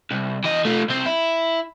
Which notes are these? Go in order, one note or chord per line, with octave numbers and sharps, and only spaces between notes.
C2
E3 D#5
A3 F4
C2 C4
E4